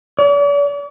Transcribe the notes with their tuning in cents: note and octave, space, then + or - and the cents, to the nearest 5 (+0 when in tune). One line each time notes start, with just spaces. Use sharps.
D5 -45